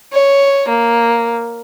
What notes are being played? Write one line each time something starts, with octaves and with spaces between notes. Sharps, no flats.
C#5
A#3